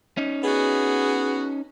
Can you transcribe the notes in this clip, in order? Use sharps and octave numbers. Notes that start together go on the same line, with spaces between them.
C#4 D#4
B3 F#4 G#4